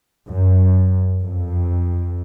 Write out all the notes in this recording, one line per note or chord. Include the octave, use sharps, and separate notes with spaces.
F#2
F2